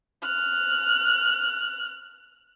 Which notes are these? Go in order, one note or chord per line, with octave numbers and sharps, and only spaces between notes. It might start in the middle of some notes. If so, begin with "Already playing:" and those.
F6 F#6